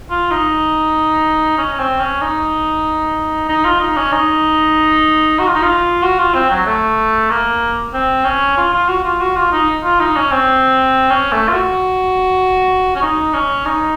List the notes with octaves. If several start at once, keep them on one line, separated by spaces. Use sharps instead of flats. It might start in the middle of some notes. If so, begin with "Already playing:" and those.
F4
D#4
C#4
C#4
C4
C#4
D#4
D#4
F4
D#4
C#4
D#4
F#4
F4
D#4
F4
F#4
F4
C4
F#3
A3
A#3
C4
C#4
F4
F4
F#4
F4
F#4
F4
D#4
F4
D#4
C#4
C4
C#4
A3
F4
F#4
C#4
D#4
C#4
D#4